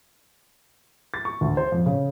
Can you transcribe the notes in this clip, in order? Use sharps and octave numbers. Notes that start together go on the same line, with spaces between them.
A6
C#6
D2
C5
F2
C#3